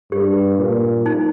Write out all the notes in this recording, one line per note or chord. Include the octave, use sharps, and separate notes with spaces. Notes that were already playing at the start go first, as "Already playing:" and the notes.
G2 G4
A#2
D#4